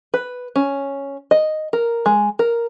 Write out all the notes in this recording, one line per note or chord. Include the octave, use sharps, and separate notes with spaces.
B4
C#4
D#5
A#4
G#3
A#4